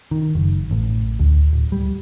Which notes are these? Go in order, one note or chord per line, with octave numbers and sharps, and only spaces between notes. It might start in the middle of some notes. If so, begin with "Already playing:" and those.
D#3
F#1
A1
D2
D1
G3